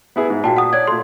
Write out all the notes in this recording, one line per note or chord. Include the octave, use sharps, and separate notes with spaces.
B3 E4 G#4
G#2
A#2 F#4 G5 A5
F#5 D#6
C#5 D5 G#6
A#2 A3 C6